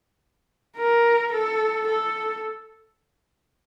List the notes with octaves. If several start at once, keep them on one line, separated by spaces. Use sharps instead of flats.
A#4
A4
A4